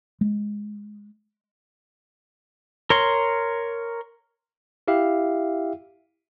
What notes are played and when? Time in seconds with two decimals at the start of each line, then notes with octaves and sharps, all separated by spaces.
0.21 G#3
2.90 A#4 C#5 C6
4.88 E4 G4 E5 F5